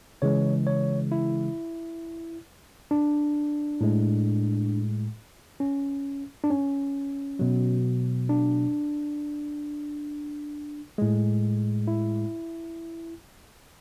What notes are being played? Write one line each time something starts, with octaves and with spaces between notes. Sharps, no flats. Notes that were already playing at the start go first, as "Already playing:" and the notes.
C#3 E3 G#3 C#5
C#5
E4
D4
A2 G#3
C#4
D4
C#4
B2 F#3
D4
A2 G#3
E4